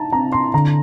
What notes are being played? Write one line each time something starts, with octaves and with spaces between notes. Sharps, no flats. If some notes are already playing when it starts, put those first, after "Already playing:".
Already playing: D#4 A5 A#5
C4 A#5
C6
D3 A#5